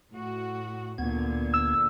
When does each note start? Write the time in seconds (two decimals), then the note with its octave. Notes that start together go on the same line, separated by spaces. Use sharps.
0.12 A2 F#4
0.98 D2 A#2 D3 B3 G#6
1.54 E6